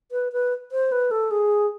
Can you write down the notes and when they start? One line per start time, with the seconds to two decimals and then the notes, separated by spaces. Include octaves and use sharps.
0.12 B4
0.32 B4
0.72 C5
0.92 B4
1.11 A4
1.31 G#4